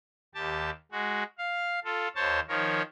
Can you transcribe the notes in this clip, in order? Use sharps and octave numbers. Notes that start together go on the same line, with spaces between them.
D#2 G4 A5
G#3 F#4
F5
F4 A4
D#2 C5 C#5 A5
D#3 F3 A#4 C#5